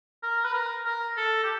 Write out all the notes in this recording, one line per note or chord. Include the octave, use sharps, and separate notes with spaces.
A#4
B4
A#4
A#4
A4
G4